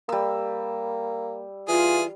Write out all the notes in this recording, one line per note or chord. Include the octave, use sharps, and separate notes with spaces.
G3 A#3 E6
E3 F4 G#4